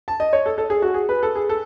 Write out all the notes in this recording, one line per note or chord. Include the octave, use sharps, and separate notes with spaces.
A5
D#5
C#5
A4
A4
G#4
F#4
G#4
B4
A4
G#4
A4